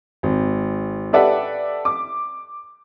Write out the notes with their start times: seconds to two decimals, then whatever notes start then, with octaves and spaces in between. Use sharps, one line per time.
0.23 G#1
1.13 G4 A4 B4 D5 E5 F#5
1.85 D6